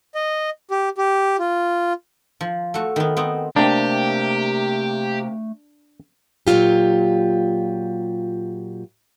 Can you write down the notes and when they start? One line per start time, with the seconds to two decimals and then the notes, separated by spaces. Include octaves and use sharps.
0.15 D#5
0.71 G4
0.98 G4
1.39 F4
2.41 F3
2.74 A3 F#4
2.96 D#3 B3
3.17 B3 C4 D#4
3.56 C3 A3 A#3 D4 G4
6.47 A#2 F3 F#3 F4 G4